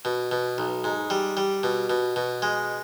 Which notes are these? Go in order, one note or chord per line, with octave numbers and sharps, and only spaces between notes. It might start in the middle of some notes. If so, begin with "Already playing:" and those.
B2
B2
B1
G#2
G3
G3
B2
B2
B2
G#3